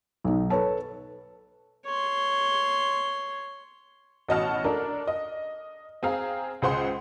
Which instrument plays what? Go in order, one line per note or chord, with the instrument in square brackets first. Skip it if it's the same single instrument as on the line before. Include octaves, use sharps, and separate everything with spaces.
[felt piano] B1 D#4
A4 B4 C#5 A5
[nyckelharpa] C#5 C6
[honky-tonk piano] A1 B2 D#5 F#5 A5 F6
D4 A4 A#4
D#5
C4 G#4 F5 A#5
C#2 G#4 C5 F#5 C6